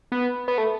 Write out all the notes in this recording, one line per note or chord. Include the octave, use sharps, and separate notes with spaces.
B3
B3
A3